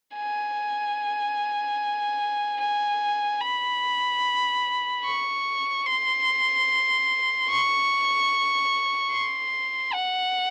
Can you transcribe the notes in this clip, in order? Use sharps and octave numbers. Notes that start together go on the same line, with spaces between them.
G#5
G#5
B5
C#6
C6
C#6
C6
F#5